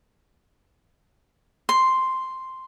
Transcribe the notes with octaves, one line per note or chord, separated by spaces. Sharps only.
C6